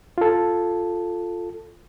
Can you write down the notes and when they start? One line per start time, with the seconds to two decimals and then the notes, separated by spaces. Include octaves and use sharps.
0.18 F4 A4